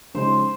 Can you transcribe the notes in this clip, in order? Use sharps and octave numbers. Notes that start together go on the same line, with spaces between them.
C#3 F3 G#3 D#4 C5